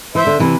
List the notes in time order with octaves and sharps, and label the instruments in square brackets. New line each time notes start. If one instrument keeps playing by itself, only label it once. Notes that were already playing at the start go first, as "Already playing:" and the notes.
[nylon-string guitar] E3 [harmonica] C5 E5
[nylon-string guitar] D3
C3 E3